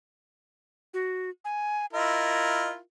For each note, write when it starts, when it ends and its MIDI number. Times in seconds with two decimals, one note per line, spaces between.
0.94 1.30 66
1.45 1.86 80
1.93 2.77 64
1.93 2.77 65
1.93 2.77 70
1.93 2.71 75